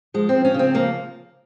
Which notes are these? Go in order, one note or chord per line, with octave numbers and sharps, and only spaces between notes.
F3 G#3
C4
F3
C#4
C#3 C4
F3 A#3